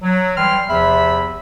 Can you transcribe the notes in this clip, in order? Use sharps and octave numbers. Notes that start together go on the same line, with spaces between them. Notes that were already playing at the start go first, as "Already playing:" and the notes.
F#3
E3 G3 G5 C6 F6
E2 C3 F3 E5 B5